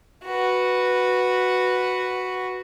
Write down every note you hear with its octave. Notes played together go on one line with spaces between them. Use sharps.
F#4 B4